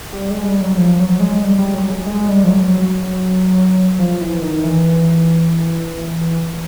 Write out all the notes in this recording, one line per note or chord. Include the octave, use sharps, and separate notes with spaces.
G3
G#3
G3
F#3
F3
F#3
G#3
G3
G3
F#3
G#3
G#3
G3
F3
F#3
F3
E3
D#3
E3